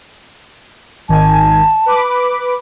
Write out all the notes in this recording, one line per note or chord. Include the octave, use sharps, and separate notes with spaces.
G#1 D#3 G#5 A5
B4 B5 D6